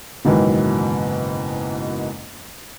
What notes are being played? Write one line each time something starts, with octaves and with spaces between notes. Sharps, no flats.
F#1 G#2 B2 D#3 E3 F#3